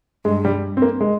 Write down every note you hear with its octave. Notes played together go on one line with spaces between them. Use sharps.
G2 G#3
G3
C4
A#3
G#3